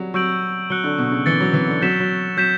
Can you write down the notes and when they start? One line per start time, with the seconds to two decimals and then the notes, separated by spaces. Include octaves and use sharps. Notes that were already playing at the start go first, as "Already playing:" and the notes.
Already playing: F#3 G3
0.14 F#3 C#6 E6 G6 D7 F#7
0.70 F#3 F#6 C#7 G7
0.84 D3
0.98 B2
1.12 C#3
1.26 E3 A6 C#7 G7
1.40 F#3
1.53 E3
1.68 D3
1.81 F#3 G6 B6 E7
2.00 F#3
2.37 F#3 G6 B6 E7